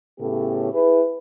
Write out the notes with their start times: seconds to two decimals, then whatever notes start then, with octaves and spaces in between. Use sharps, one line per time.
0.19 A2 C#3 B3 G4 A4
0.72 E4 G#4 B4